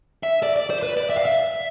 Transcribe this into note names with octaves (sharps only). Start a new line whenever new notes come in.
E5
D5
D5
C5
B4
D5
E5
F5
E5